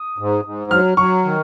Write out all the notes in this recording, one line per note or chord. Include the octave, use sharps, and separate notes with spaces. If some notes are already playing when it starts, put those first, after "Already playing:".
Already playing: D#6
G#2
G#2
F#3 F6
F#3 C#6
D#3